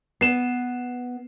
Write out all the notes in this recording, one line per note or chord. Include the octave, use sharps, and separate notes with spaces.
B3 C7 E7